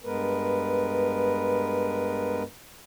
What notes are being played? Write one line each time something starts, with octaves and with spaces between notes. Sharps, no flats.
G2 G#3 B3 A#4 B4